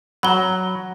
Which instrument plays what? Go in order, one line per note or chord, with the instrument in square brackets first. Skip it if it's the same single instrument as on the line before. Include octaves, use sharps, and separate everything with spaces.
[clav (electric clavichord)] F#3 [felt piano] F#5 A#5 [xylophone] B5 G7